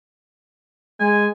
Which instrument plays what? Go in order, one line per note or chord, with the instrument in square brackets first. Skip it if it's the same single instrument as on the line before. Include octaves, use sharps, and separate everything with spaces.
[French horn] G#3 [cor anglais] G#5